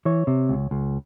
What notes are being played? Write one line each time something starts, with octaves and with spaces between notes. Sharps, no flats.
E3 C#5
C3
C#2
C#2